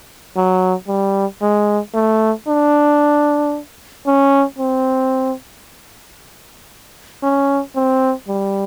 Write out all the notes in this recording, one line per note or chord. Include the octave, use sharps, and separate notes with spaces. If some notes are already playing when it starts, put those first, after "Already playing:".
F#3
G3
G#3
A3
D4
C#4
C4
C#4
C4
G3